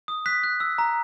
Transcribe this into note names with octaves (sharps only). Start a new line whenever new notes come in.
D#6
F#6 B6
F#6
E6
A#5